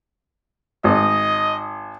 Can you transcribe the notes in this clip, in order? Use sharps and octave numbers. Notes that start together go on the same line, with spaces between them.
G#1 D#5